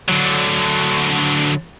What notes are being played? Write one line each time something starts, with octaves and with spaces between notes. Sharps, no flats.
D3 F#3